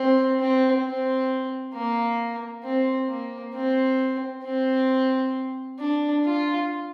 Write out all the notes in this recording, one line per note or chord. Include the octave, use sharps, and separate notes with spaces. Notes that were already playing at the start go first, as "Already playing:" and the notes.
Already playing: C4
C4
C4
A#3
C4
A#3
C4
C4
D4
F4